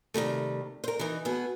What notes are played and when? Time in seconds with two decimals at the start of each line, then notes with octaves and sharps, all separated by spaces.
0.14 C3 D#3 G3 A3
0.84 A#4 C5
0.99 E3 D#4
1.25 B2 A3 B3 G#4